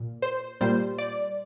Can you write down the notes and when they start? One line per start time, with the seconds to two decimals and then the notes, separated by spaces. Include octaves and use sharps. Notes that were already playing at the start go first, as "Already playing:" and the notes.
Already playing: A#2
0.22 C5
0.61 A#2 G3 C5
0.98 D5